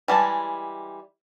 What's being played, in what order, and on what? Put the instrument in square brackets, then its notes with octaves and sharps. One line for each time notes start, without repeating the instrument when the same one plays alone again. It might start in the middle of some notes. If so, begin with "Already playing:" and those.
[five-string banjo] E3 G3 G#3 A5